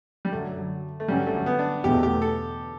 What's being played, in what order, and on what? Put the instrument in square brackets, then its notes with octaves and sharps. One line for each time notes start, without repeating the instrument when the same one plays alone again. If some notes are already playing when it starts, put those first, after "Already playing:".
[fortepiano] G3
[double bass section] F#2 D3 F#3 [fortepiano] A3
[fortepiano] A3
[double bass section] G2 D3 F#3 C#4 [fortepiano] G3
[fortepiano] A3
B3
D4
[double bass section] E2 B2 A3 [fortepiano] G4
[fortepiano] G4
A4